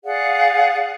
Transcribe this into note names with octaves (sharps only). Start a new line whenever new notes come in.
G#4 D5 F5 F#5